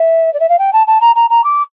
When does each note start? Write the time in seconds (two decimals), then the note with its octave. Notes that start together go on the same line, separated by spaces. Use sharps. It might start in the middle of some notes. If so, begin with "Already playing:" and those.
Already playing: E5
0.34 D5
0.40 E5
0.49 F5
0.59 G5
0.73 A5
0.87 A5
1.01 A#5
1.16 A#5
1.30 A#5
1.44 D6